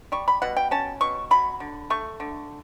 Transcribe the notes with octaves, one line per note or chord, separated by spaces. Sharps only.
G3 C#6
B5
B2 F#5
G5
C#4 A5
B2 C#6
F#3 B5
D3
A3 C#6
D3